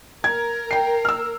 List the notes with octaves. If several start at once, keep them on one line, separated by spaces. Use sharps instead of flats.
A#4 G#6
G5 C7
E6 F6